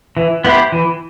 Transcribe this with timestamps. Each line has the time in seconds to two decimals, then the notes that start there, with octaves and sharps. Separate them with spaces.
0.17 E3
0.45 B3 E4 G4 C5
0.72 E3